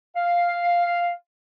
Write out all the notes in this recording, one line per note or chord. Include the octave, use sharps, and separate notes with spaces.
F5